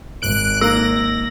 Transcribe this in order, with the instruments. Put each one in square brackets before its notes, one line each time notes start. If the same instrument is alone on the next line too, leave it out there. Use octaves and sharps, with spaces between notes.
[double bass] G#1 [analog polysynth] F#6 D7
[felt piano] A#3 D#4 [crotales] E6 [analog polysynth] A#6